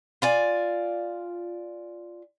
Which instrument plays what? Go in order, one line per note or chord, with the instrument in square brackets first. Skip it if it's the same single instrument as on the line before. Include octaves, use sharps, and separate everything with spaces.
[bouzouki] F4 D5 G#5